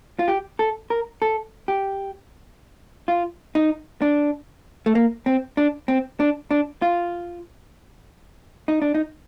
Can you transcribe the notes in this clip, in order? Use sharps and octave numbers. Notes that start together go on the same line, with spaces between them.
F4
G4
A4
A#4
A4
G4
F4
D#4
D4
A3
A#3
C4
D4
C4
D4
D4
F4
D#4
D4
D#4